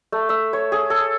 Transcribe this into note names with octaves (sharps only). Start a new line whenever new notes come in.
A3
E5
C#5
G#4
A4